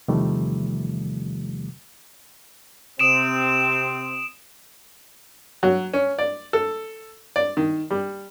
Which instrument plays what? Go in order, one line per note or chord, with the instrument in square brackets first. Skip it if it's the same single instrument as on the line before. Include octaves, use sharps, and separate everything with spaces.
[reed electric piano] E2 C3 D#3 F3 G3 A3
[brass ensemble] C3 C4 [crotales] D#6 D7 E7
[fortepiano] F#3
C#4
D5
A4
D5
D#3
G3